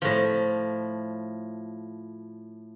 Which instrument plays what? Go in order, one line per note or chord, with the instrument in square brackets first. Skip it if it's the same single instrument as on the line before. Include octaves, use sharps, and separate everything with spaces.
[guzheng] A2 F3